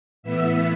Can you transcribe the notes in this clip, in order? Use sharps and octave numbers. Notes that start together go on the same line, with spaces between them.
A2 E3 B3 E5